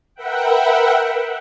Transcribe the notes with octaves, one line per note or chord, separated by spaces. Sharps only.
A#4 B4 E5 F#5 G5